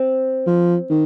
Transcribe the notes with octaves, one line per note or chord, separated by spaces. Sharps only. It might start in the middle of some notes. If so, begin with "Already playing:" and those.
Already playing: C4
F3
D#3